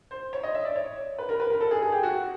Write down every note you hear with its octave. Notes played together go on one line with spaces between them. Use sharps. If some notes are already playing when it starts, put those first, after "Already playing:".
C5
C#5
D#5
E5
D5
C#5
B4
A#4
B4
A#4
A4
G#4
G#4
G4
F#4